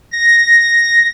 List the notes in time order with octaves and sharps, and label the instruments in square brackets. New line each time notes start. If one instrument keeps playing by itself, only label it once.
[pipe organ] A#6